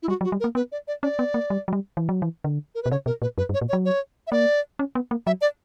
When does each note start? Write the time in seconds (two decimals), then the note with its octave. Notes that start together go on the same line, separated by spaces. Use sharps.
0.03 E4
0.08 G3 F#4
0.21 F#3
0.24 F#4
0.32 G3
0.40 A#4
0.44 A#3
0.55 B3 B4
0.72 D5
0.88 D5
1.03 C#4 D5
1.19 B3
1.34 A#3
1.50 G3
1.68 F#3
1.73 G3
1.97 E3
2.09 F#3
2.22 E3
2.44 D3
2.75 A#4
2.83 B4
2.86 B2
2.91 C#3 C#5
3.06 B2 A#4
3.22 A#2 B4
3.38 F#2 B4
3.49 G2
3.54 C#5
3.61 A#2
3.69 C#5
3.73 F#3
3.85 C#5
4.27 E5
4.32 A#3 D5
4.79 C#4
4.95 B3
5.11 A#3
5.27 F#3 E5
5.41 D5